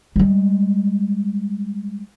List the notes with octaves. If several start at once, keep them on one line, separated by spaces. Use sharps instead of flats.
G3 G#3